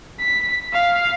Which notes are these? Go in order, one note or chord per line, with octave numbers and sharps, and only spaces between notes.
B6
F5